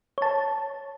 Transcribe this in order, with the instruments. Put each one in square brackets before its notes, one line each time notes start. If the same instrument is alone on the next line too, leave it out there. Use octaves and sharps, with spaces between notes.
[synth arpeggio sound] C#5 A5